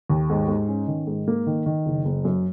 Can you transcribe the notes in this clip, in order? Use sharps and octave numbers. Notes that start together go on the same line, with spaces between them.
D#2
G#2
G#2
C#4
D#3
G#2
A#3
D#3
D#3
F#1
F#1
F#2